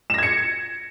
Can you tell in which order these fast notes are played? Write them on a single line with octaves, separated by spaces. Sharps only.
E7 A#6 G#6 C#7